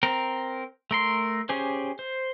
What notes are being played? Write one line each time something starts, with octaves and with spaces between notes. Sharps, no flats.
C4 A#4
A3 A#4 C6
C#4 G4 G#4 C5
C5